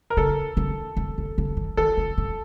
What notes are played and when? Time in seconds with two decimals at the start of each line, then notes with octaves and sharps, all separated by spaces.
0.10 A#4
0.17 C#3 A4
0.57 C#3
0.97 C3
1.18 C#3
1.38 C#3
1.57 D#3
1.77 D#3 A4
1.97 C#3
2.18 C3